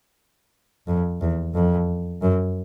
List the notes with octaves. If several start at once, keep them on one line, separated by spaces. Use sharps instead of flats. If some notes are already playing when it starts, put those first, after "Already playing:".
F2
E2
F2
F#2